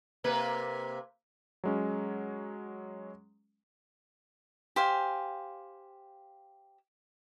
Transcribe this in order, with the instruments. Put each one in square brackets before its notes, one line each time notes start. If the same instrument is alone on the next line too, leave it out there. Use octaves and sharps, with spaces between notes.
[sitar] C3 A#3 B4
[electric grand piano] F#3 G#3 C#4
[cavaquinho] G4 C5 F5 G#5